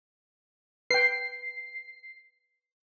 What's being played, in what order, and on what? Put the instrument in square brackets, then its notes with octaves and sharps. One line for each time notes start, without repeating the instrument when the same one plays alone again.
[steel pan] B4 G5 [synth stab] C7